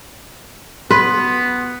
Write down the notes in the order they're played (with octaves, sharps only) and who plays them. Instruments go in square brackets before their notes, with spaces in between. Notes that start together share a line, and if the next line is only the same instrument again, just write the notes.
[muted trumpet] B3 [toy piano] F#4 [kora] B4